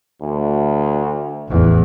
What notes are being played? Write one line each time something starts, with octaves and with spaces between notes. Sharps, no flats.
D2
A1 E2